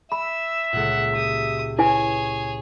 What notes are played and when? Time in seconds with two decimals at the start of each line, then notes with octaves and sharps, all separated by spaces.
0.12 E5 B5 E6
0.73 C#2 A#2 F#5
1.15 G4 D#6
1.79 E4 G#4 B4 C#5 G#5